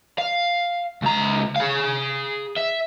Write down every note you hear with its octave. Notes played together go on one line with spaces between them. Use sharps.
F5
C#2 A#5
G#4 F5
E5